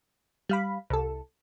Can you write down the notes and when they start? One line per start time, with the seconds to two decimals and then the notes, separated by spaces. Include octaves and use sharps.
0.49 G3 F5 B5
0.90 C2 A4